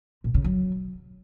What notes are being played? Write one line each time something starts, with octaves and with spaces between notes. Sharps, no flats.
A#2
C#3
F#3